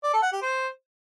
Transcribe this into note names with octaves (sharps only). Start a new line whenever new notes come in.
D5
A4
F#5
G4
C5